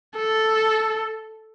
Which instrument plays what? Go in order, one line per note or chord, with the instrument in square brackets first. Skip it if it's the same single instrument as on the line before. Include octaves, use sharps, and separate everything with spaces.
[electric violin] A4